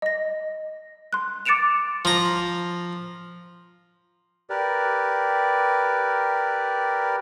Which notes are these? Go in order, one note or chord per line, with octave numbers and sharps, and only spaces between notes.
D#5 A#6
C6 F#6
D6 A6 C#7 D7 E7 F7
F3 A#5
G4 A#4 B4 D5